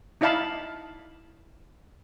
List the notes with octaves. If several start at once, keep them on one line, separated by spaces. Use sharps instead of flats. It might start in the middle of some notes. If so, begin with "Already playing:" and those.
D#4 E4 D5 F5 A5 B5